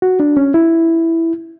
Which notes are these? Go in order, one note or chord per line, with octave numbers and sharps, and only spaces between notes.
F#4
D4
C#4
E4